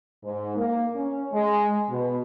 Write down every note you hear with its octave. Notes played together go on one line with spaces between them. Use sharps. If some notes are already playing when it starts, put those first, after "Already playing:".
G#2
A#3
C#4
G#3
B2